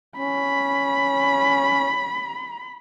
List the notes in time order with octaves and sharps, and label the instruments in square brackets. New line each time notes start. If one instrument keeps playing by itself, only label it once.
[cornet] C#4 [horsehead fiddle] B5